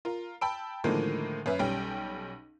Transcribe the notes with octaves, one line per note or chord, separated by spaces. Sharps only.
F4 A#4
G5 A5 B5 E6 D7
A2 D3 D#3 F3 G#3 A#3
F#2 C#4 B4 E5
B1 G3 C#4 G5